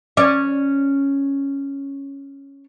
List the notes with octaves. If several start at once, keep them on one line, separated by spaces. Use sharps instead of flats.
C#4 D5